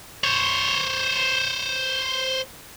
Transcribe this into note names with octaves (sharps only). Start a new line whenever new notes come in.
C5 C#5